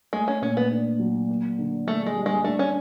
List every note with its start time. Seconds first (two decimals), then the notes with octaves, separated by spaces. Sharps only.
0.13 G#3 A3
0.28 C#4
0.42 A#2 C#4
0.57 B3
0.71 D4
0.99 F#3
1.29 A#3
1.59 D3
1.87 A3 D4
2.06 G#3
2.16 G3
2.26 G#3
2.44 A3 D4
2.59 C#4